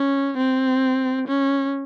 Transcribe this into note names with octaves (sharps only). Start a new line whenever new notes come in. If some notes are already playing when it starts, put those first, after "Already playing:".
Already playing: C#4
C4
C#4